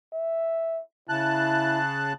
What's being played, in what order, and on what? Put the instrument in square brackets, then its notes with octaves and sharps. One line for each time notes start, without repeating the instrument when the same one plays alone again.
[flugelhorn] E5
[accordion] C#3 A5 F#6 [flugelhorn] E4